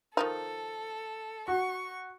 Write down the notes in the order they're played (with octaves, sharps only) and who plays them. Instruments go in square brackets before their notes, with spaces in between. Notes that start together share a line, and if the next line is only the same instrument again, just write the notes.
[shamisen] D#3 F3 D#4 [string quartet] A4
[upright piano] F#4 [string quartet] C#6